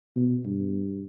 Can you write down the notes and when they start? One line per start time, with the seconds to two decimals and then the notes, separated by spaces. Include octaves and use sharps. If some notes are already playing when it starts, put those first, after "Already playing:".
0.16 B2
0.45 G2